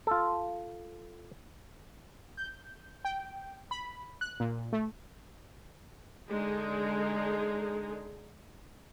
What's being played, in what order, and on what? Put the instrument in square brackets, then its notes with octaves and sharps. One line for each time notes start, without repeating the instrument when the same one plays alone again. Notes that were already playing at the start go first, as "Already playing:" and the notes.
[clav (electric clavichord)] F4 A4
[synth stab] G6
G5
B5
F#6
A#2
A3
[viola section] D3 G#3 D#4 G#4